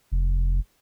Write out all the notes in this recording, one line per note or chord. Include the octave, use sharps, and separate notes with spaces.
F1